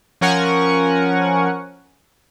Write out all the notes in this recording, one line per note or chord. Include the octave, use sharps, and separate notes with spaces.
F3 C#4 A#4 F#5 G#5 C#6